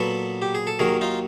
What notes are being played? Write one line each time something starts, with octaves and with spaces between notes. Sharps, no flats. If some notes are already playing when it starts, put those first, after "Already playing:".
Already playing: A#2 F#3 B3 A4 B4
G4
G#4
A4
D#2 D#3 F#3 G#4 A#4
D#4 F4